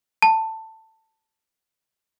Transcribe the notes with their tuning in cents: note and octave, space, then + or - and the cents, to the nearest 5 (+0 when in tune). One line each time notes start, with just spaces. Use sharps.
A5 +15